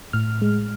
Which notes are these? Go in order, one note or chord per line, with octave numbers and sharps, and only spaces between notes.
A2 F6
G#3